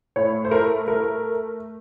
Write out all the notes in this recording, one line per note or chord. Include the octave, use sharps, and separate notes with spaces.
A2 C#5
C5
A3 A#4
A3 A#4